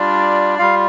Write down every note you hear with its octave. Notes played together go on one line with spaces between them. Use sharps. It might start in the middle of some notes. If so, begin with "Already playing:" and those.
Already playing: G3 D4 F4 D5
G3 F4 F5